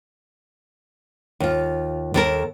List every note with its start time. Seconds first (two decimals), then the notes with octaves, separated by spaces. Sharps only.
1.40 D#2 F4
2.14 D#2 A4 A#4